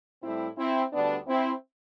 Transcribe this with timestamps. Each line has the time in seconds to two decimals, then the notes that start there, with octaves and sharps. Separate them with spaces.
0.23 A2 G3 C4 E4
0.58 C4 E4
0.92 D2 D3 G3 B3 D4
1.27 C4 E4